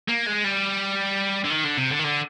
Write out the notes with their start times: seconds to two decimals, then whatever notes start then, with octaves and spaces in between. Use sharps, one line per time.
0.08 A#3
0.26 G#3
0.44 G3
1.45 D3
1.51 D#3
1.64 D3
1.77 C3
1.91 D3
1.99 D#3
2.04 D3